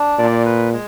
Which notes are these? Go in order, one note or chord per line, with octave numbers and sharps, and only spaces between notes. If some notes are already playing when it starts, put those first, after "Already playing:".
Already playing: D4
A#2 D5
B4
G#3